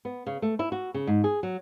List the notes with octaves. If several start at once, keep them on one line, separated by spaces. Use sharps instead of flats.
B3
C#3
A3
E4
F#4
C#3
G#2
G#4
F#3